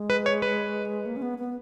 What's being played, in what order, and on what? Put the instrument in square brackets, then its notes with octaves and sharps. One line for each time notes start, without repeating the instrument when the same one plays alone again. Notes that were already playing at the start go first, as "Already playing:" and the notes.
Already playing: [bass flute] G#3
[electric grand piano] B4
C#5
B4
[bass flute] A#3
C#4
B3
B3